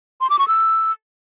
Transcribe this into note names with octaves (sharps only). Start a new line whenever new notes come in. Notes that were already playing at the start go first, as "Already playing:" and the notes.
C6
D6
C#6
E6